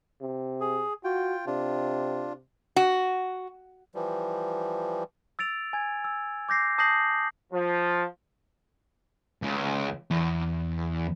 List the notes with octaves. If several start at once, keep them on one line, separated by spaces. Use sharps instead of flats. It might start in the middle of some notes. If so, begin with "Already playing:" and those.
C3
G#4
F4 F#4 G5
C3 D4 F4
F#4
E3 F3 G3
E6 A6 D7 F7
G#5 G#6
E6
D6 G6 A#6 C7
A5 D#6 G6 A#6 C7 F#7
F3
C#2
E2